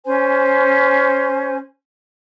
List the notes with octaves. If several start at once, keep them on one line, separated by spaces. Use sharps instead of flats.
C#4 C5 G#5